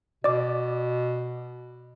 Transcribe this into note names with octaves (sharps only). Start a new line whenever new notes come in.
B2 D5 D6